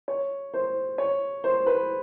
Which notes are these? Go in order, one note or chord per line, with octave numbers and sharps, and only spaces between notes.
C#5
C5
C#5
C5
B4